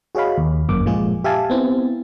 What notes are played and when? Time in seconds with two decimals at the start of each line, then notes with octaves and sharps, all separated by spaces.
0.15 F#4 G#4 C#5 D#5 F5 B5
0.37 D#2
0.69 G1 F#2 A#3 D6
0.86 A#2 F3 G#3 F4 G#4
1.24 G4 E5 F5 G#5 A5
1.50 B3 C4 E4